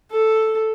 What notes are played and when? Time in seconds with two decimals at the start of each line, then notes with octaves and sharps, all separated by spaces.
0.11 A4